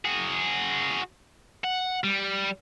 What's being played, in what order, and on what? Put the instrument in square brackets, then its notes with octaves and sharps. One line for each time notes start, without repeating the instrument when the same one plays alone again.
[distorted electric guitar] F#4 G#4
F#5
G3